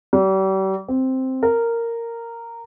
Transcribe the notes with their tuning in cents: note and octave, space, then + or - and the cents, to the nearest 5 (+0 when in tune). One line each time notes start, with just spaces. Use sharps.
G3 -40
C4 +0
A#4 -10